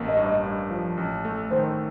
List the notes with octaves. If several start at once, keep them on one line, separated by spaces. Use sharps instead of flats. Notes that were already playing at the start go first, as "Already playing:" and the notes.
Already playing: A1 A#3
D#5
G2
D#5
G2
F3
A1
A3
D#3 C5